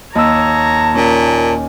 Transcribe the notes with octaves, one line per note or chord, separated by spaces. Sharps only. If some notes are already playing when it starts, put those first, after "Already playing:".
D#2 C#5 A5 A#5 E6
A#2 C#4